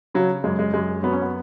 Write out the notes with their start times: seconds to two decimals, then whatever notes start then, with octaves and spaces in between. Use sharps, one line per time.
0.14 C#3 F#3
0.44 F#2 G#3
0.59 G#3
0.74 F#2 G#3
1.03 F#3 B3
1.12 C#4
1.22 B3